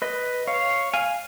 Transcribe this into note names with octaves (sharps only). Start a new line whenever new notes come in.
B4 D#5
C#5 F5
F5 G#5